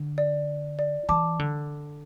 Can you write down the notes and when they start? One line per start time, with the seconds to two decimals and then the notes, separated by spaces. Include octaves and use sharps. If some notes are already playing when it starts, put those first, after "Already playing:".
Already playing: D3
0.18 D5
0.79 D5
1.09 E3 A5 D6
1.39 D3